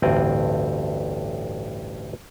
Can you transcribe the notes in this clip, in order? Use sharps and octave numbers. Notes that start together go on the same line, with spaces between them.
A1 D2 G2 C4 D5 D#5